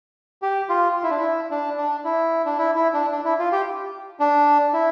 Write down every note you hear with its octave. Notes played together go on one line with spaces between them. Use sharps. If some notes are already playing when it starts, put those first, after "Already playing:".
G4
F4
F4
E4
D4
E4
D4
D4
E4
D4
E4
E4
D4
D4
E4
F4
G4
D4
E4